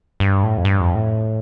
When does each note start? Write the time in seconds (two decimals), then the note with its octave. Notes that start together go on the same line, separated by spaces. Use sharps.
0.20 G2
0.43 A2
0.58 F2
0.65 G2
0.80 F2
0.95 A2